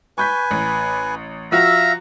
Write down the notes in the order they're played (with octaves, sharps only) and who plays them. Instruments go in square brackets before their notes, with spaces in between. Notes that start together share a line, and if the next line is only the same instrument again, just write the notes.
[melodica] B4 G#5 [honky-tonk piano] C#6 G6 B6
[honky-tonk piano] A1
[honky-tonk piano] F3 F4 F#4 [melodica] E5 F5 E6 [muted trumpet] A#5